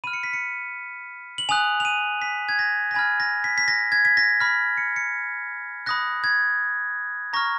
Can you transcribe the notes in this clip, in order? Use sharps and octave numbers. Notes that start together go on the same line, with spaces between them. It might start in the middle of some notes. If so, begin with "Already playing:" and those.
B5 F6 D#7
C#7
B6
C#7
F#7
G#5 D#6 F#6 F7
F7
D#7
B6
G#6
A#6
A#6
G#5 B5 F6 G#6
A#6
B6
B6
A#6
G#6
B6
A#6
B5 F6 B6
C#7
C#7
B5 D#6 F#6 A#6
G#6
A#5 C#6 F6 A#6